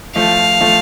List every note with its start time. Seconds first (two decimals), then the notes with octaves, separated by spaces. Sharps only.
0.15 F3 A3 F5
0.61 F3 A3